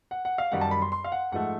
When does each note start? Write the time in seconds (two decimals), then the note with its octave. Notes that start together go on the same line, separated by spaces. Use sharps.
0.11 F#5
0.25 F#5
0.38 F5
0.52 F#2 D#3 G3 F#5
0.61 A5
0.71 B5
0.82 C6
0.92 C6
1.04 F5
1.12 F#5
1.32 G#2 F3 A3 F#5